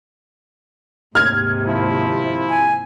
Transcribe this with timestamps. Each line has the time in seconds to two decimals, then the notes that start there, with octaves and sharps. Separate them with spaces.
1.15 D#2 G#2 C3 F6 G#6
1.66 F3 E4
2.50 G#5